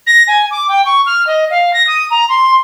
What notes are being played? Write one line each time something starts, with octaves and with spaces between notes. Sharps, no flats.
A#6
G#5
D6
G5
C#6
F6
D#5
F5
A#6
D#6
A#5
C6